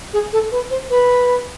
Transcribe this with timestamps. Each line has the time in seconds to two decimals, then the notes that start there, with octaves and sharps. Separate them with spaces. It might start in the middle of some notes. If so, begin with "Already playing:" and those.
0.13 G#4
0.33 A4
0.51 B4
0.70 C5
0.90 B4